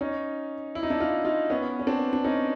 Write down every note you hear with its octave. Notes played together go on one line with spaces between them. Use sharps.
C#4 D#4
E4
D#4
D4 E4
D#4 F4
D#4 F4
B3 C#4
C#4
C4 D4
D4
C#4 D#4